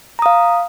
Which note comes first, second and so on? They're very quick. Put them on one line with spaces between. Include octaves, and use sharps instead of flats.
A#5 D#6 F5